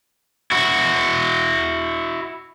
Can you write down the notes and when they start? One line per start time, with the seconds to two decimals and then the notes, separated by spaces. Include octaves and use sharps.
0.51 E4 F#4